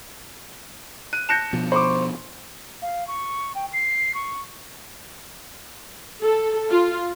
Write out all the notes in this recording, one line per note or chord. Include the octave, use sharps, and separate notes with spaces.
F#6 D#7
A5 F#6 G6 A#6 C#7 E7
B2 F3
C5 B5 C#6 D6
F5
C#6
G5
C7
C#6
A4
F4